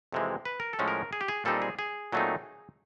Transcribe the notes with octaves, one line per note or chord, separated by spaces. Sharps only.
F2 C3 E3 G#3
B4
A#4
A4
A2 F3 G#3 C#4
A#4
G#4
G4
G#4
A#2 G3 C4 D#4 A4
G#4
G#4
A#2 F#3 A3 C4 D#4